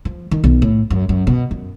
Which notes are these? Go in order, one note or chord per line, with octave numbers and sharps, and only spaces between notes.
F3
D#3
B1
A2
F#2
F#2
B2
F#2